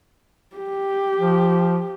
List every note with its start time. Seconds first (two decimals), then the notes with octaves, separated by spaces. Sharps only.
0.56 G4
1.19 F3